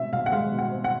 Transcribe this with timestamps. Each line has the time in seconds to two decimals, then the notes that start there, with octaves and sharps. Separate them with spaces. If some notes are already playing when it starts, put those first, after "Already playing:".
Already playing: B2 G#3 C4 E5
0.13 B2 F5
0.26 F#5
0.32 G#3 F5
0.52 B2
0.58 F#5
0.71 C4
0.84 F#5